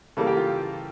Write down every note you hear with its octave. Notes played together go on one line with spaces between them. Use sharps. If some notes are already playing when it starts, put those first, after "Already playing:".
C#3 E3 G3 A#3 A4
G4
F4